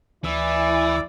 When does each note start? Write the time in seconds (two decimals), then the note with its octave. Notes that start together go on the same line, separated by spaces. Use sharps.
0.24 D2 E3 E4 D5 E6